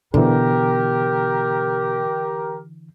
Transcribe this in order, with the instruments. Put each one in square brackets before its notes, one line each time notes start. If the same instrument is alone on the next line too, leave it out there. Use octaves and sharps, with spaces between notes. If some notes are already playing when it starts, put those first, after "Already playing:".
[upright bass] B2 [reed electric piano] D3 E3 [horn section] G4 A#4